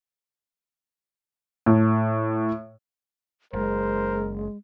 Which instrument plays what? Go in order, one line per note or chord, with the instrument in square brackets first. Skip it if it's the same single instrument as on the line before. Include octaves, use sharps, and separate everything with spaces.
[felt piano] A2
[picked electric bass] F#1 [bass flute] G#3 [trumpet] A#4 [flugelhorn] C5